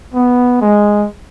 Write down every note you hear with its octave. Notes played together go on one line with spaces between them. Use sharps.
B3
G#3